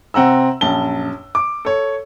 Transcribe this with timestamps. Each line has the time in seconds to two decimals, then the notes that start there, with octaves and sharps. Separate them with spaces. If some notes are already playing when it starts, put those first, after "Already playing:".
0.14 C3 C4 F#5 A#5 E6
0.61 A#1 F#2 A5 G7
1.35 D6
1.65 A4 C#5